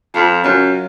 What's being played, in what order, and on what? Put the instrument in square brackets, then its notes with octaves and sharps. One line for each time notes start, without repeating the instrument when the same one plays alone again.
[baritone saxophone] F2 [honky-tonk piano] F4
[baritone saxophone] F#2 [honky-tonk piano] F#3